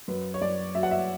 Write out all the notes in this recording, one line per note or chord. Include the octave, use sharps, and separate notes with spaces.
F#2 B4
C#5
F#2 D5
F#3 E5
F#5
E5